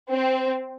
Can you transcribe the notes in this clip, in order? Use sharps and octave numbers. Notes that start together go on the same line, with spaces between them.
C4